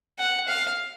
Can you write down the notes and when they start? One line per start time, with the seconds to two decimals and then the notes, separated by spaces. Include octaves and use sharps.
0.19 F#5
0.48 F5